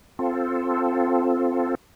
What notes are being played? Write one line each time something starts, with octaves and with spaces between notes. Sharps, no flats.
C4 F4 A4